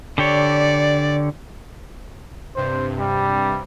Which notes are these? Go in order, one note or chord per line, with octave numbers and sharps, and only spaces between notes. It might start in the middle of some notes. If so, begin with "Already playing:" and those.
D3 G4 C#5 D5
G2 C3 C5
G3